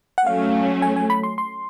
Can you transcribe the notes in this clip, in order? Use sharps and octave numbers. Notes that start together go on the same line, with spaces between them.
F#5
F#3 A3 C#4 F5
G#5
G#5
B5
C6
C6